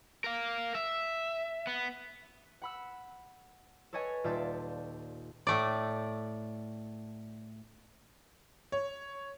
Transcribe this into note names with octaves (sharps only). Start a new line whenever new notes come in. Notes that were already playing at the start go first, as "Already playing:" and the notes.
A#4 F5
E5
B3
F#5 B5 E6
A4 B4 C#5 D#5 G#5
D#1 F4 D5 E5 A5 G6
A2 A3 D5
C#5